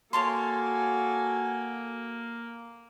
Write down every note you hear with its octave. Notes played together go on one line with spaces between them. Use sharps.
A#3 F#4 A4 C#5 G#5 A5 C6